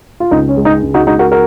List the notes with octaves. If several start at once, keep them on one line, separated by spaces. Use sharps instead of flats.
F4
C#2 D#4
C#4
G#3
D#4
C#2
D#4 F#4
G#3 D#4 F#4
F#4 A#4
F#4 A#4